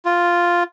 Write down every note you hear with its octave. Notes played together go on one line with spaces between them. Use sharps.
F4